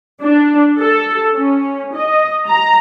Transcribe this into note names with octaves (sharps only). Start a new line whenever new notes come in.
D4
A4
C#4
D#5
A#5